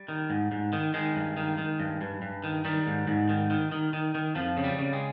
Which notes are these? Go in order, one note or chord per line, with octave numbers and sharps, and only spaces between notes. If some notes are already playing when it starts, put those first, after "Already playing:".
Already playing: G3
D#3
G#2
G#2
D#3
D#3 G#3
G2
D#3
D#3
G2
G2
G2
D#3
D#3 G3
G#2
G#2
D#3
D#3
D#3
D#3
D#3
F2 F3
C#3
G3
C#3
G#3